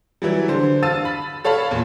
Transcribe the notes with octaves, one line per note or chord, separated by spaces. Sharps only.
E3 F#3 G3
D3 C5
F5 A5 E6 A6 D#7
B5
A4 C#5 F5 A5 B5
E2 A#2